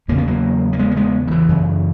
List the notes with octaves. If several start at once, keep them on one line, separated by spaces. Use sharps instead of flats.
E2 C#3 A#3
B3
F#3 A#3
A#3
G#3 B3
A#3
G#3 B3
D#3
E3
F#2 C#3